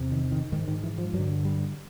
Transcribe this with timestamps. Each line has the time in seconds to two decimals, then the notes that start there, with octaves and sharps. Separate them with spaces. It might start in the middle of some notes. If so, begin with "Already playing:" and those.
Already playing: E2 C3
0.12 D#3
0.32 D#3
0.52 G#2 D#3
0.68 D#3
0.84 E3
0.98 F3
1.13 G2 F#3
1.19 D3
1.45 G3